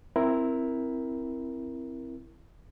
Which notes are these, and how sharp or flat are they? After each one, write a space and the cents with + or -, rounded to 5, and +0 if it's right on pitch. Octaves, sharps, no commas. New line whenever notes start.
C4 +0 E4 +0 A#4 +5